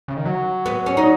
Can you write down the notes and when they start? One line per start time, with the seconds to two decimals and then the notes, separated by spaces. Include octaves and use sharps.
0.08 C#3
0.17 D#3
0.25 F#3
0.66 B3
0.86 C#4
0.97 D#4